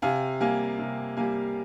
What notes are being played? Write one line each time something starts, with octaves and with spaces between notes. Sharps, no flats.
C3 F5 G#5
G3 A#3 F5 G#5
C3
G3 A#3 F5 G#5